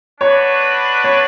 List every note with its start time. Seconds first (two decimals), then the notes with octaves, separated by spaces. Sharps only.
0.20 D4 F#4 B4 C#5 D5
1.04 C#5